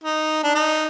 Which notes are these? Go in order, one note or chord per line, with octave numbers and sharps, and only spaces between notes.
D#4
D4
D#4